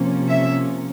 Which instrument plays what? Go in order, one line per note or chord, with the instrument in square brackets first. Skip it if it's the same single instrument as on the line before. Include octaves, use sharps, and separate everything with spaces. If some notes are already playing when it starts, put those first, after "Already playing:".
Already playing: [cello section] C3 F3 A#3 C#4
E5